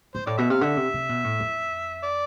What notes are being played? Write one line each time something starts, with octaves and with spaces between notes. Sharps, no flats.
G#2 C5
A2 D5
B2 E5
C3 F5
D3 E5
C3
C3
B2
A2
F2
D5